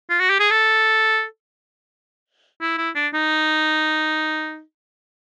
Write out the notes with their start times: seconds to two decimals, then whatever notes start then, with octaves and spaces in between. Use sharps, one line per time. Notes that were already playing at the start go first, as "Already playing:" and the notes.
0.10 F4
0.19 F#4
0.30 G4
0.40 G#4
0.51 A4
2.61 E4
2.78 E4
2.95 D4
3.14 D#4